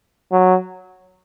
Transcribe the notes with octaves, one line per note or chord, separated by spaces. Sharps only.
F#3